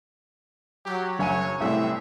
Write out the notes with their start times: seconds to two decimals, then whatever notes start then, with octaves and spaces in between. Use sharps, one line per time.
0.85 F#3 G4
1.19 F#1 C#5 G#5 D#7
1.60 C2 F#2 A2 E3 C4 E5